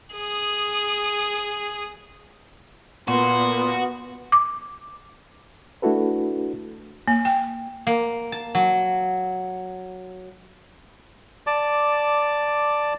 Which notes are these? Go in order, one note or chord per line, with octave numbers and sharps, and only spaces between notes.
G#4 D#6
A#2 B3 F#4 C6
D6
A3 D4 E4 F#4 A4 B4
A#3
G5
A#3
A5
F#3
D5 A5 D6